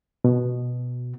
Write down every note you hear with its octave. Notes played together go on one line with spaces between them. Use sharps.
B2